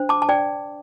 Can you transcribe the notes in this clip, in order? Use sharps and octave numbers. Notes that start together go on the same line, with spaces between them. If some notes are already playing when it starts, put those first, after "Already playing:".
Already playing: D4 C5
A5 D6
A5
D5 G5